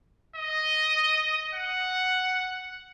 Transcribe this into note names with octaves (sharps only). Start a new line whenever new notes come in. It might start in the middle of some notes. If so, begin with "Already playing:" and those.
D#5
F#5